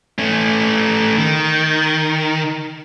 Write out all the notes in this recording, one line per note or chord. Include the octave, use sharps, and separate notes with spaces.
A3 C#4
D#3